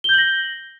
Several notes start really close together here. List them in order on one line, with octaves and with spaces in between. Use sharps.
G7 G6 F#7 A#6